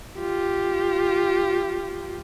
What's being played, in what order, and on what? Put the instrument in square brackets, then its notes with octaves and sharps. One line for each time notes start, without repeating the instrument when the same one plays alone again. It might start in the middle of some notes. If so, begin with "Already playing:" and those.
[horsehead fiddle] F4 G4